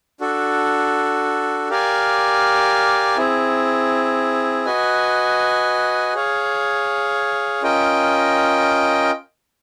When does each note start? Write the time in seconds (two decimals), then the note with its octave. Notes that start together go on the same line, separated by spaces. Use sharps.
0.21 D4 F#4 A4
1.69 G4 A#4 D5 F5 G#5
3.17 C4 E4 G#4
4.65 F#4 B4 D#5 G#5
6.15 G#4 C#5 F5
7.63 C#4 F4 A#4 D#5 G5